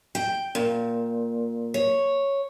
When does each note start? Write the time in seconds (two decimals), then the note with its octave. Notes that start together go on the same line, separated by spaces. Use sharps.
0.15 G5
0.55 A#2
1.74 C#5